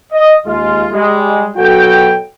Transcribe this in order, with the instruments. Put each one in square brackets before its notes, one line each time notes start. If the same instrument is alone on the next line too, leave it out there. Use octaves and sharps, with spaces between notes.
[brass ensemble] D#5
D#2 G#3 F4
G3 G#3
B2 F#3 F#4 A4 G5